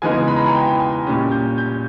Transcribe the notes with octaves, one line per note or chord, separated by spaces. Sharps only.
C#3 E3 G#3 B3 D#4 G#5
B5
A#5
G#5
G5
G#5
A#2 G3 C#4
G6
G6